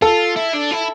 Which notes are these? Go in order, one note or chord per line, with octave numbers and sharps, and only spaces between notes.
F4 A4
E4
D4
E4